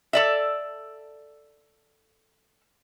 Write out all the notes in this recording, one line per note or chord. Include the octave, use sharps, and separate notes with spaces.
A4 D5 E5